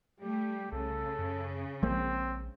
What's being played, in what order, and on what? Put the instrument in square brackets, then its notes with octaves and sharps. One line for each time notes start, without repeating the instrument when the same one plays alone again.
[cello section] G3 A3 [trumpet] G4
[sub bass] C2 [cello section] C#3 [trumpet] A4
[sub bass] F#2
[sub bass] A#1 [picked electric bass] F3 G#3 A#3 [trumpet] C4